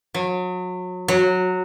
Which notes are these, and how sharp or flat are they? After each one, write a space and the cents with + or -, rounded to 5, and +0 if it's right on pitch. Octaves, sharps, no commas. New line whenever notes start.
F#3 -30
F#3 -10